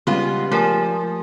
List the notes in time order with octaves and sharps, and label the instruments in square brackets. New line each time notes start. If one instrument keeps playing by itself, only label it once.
[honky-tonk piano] C#3 G3 G#3 [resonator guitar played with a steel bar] B3 F4 [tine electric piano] G4 C6
[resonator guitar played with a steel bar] F3 [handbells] A3 A#4 G#5